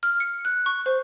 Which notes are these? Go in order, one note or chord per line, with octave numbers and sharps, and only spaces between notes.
F6
C#7
F#6
C#6
C5